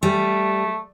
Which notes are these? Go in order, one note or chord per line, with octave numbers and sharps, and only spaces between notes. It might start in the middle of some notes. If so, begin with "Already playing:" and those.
G3 A3